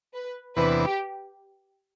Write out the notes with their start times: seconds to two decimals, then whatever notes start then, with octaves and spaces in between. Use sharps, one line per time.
0.14 B4
0.56 E2 C3 E3 B3 D4 B4
0.84 G4